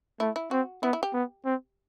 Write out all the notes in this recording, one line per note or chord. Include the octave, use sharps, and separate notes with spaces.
A3 E4
E4
C4 F#4
B3 E4
E4
G4
B3
C4